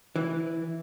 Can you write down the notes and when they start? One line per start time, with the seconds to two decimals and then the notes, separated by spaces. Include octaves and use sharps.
0.16 E3